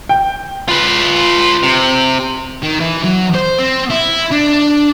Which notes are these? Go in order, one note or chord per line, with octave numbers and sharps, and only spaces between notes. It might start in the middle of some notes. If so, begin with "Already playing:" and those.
G5
F4 B4
C3
D#3
E3
F#3
C5
C4
E4
D4